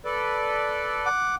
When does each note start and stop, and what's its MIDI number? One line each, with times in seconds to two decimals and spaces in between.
0.05 1.09 69
0.05 1.09 71
0.05 1.09 74
1.06 1.35 78
1.06 1.35 86